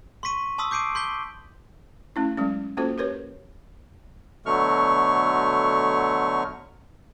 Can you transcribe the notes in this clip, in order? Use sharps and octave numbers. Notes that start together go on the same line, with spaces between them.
C6 C#6 B6 D#7
A5 C6 D#6 E6 B6
D6 G6 C7 D7 D#7
C6 G6 B6 G7
A3 C#4 E4
F#3 G#3 C#4
A#3 C#4 F4 F#4 A4 C5
G4 A#4 B4 C#5
B2 D3 F#3 A3 C#6 F6